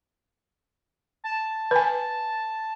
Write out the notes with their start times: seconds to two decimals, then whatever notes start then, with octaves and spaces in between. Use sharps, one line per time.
1.24 A5
1.71 B4 G#5